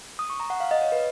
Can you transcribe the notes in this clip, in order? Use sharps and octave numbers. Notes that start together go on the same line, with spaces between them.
D#6
C#6
A#5
F#5
F5
D#5
C#5
B4